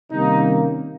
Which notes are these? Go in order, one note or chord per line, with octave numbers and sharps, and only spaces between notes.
C3 D#3 G3 A#3 C#4 D#4